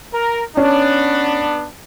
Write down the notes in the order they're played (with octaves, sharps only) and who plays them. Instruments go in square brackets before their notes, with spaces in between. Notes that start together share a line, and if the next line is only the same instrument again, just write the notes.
[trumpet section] A#4
[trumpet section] B3 D4 [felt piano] C#4